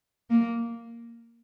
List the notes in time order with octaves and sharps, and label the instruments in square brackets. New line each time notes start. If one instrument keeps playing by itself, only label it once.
[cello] A#3